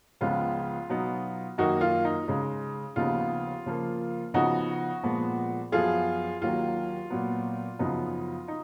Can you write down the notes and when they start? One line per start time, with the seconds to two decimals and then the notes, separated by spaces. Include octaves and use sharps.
0.21 C#2 C#3 F3 G#3 B3 F4
0.89 B2 F#3 B3 D#4
1.58 F#2 D#3 A#3 D#4 F#4
1.81 F4
2.05 D#4
2.28 C#3 G#3 D#4
2.96 D#2 C#3 F3 B3 D#4 F4
3.66 C#3 F3 A#3
4.34 C#3 F3 B3 D#4 F#4
5.03 A#2 F3 G#3 B3
5.72 F#2 F3 B3 F4 G#4
6.41 D#2 D#3 F#3 F4
7.10 A#2 F#3 B3
7.79 F#2 C#3 F3 B3 D#4
8.48 D#4